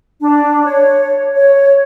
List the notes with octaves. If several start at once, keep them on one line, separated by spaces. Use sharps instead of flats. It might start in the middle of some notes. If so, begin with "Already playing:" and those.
D4
C#5
C#5